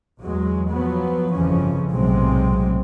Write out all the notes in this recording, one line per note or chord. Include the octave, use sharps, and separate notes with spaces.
E2 F#3 G#3
F3 F#3 B3
G1 F2 C#3 E3 F3 C#4
B1 A2 C3 F#3 G#3 C4